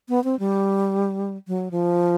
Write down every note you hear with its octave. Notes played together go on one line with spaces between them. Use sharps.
B3
C4
G3
F#3
F3